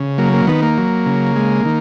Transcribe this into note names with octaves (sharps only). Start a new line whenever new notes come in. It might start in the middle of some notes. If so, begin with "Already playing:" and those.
Already playing: C#3
F#3 A#3
A#3
D#3 B3
A#3
F#3
C#3
G#3
D#3